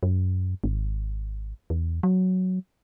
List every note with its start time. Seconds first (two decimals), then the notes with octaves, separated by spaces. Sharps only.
0.03 F#2
0.64 G#1
1.70 E2
2.03 F#3